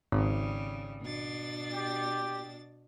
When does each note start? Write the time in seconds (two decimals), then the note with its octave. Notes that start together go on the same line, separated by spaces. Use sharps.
0.12 G#1 C#3 G3
1.02 B2 D4 A6
1.73 G4